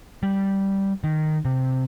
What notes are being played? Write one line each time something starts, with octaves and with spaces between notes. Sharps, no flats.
G3
D#3
C3